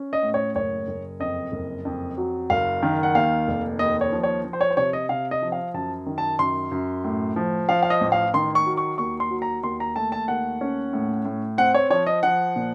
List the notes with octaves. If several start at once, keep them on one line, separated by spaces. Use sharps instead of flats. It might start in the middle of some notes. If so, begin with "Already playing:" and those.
Already playing: C#4
D#5
A2
C#5
F#1 C#5
F#1
F2 D#5
F#1
F2
F#3
F#1 F5
D#3
F#5
D#2 F5
F1
D#2 D#5
C#5
F3
C#5
F3
C5
C#5
C5
C3 C#5
D#5
C3 F5
D#5
F3
F5
F#2 A5
D#3
A5
F#2 C6
F#2
A2
F3
F3 F5
F5
D#5
A1
F5
D#3 C6
C#6
F#3
C#6
D#2 C#6
C6
F#3
A#5
D#2 C6
A#5
A3 A5
A5
D#2 F#5
C#4
A2
A2
C4 F#5
C#5
F3 C#5
D#5
F3 F#5
A#2